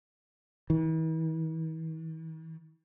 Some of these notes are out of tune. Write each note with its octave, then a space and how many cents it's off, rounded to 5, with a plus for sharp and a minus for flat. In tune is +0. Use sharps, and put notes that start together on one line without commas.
E3 -45